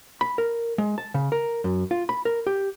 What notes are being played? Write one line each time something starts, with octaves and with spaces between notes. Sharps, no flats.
B5
A#4
G#3
A5
C#3
A#4
F#2
F4
B5
A#4
G4